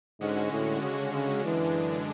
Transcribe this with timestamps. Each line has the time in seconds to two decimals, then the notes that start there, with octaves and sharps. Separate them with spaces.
0.21 G#2 D3 G#3 C#4 F#4
0.52 A2
0.82 C#3
1.13 C#3
1.44 F#2 D3 E3 G#3 D4